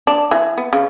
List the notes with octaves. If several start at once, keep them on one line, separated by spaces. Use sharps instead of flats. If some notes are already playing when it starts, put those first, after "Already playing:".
D4
E3
B3
C#3